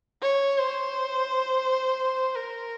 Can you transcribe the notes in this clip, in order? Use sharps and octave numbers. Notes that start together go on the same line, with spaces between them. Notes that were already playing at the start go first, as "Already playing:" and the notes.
C#5
C5
A#4